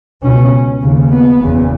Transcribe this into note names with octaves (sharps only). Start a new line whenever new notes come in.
C#2 B2 C#4
D#2 C#3
B3
F#1 E2 C#3